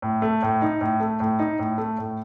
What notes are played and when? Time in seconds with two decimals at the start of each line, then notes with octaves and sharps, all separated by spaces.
0.02 A2
0.22 A3
0.42 A2
0.62 D#4
0.81 A2
1.00 A3
1.20 A2
1.39 D#4
1.59 A2
1.78 A3
1.98 A2